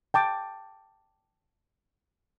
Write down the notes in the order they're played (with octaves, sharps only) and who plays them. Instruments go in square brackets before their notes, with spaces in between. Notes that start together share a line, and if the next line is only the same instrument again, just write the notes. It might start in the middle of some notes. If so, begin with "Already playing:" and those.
[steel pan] G5 A5 D6